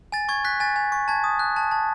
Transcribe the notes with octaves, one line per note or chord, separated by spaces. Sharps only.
G#5 A6
C#6 G#6
F#6 B6
G#5 A6
G#5
C#6
A5 G#6
D#6
F#6
A5
A5